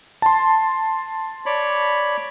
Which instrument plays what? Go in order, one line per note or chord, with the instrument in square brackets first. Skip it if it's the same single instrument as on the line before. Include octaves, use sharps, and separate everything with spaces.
[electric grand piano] A5 C6
[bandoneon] C#5 D5 B5